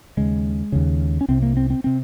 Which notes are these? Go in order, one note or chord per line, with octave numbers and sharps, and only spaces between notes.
D#2 C#3 G#3
D#2 C#3
C#4
C2 C3 C4
A#3
C4
C4
C3 C4